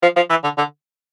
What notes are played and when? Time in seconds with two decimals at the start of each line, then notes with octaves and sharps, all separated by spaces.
0.02 F3
0.16 F3
0.30 E3
0.44 D3
0.58 D3